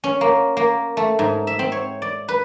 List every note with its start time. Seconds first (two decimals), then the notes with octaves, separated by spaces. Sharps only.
0.04 C#4
0.21 A#3
0.57 A#3
0.97 A3
1.19 G#2
1.47 E5
1.59 C4
1.72 C#5
2.02 D5
2.28 B4